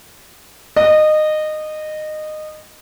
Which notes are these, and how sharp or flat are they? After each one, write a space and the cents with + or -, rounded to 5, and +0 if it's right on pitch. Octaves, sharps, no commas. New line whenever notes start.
D#5 -20